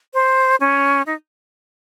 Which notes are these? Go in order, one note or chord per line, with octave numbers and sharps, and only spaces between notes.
C5
C#4
D#4